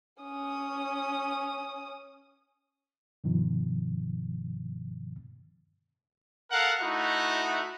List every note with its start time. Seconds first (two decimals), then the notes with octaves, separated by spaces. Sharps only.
0.22 C#4 D#6
3.24 G2 B2 D#3 F3
6.51 A4 A#4 F5 F#5
6.81 A3 D#4 E4 F#4 D#5 F#5